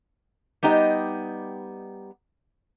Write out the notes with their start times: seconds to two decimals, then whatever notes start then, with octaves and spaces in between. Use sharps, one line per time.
0.63 G3 B3 D#4 G4 D#5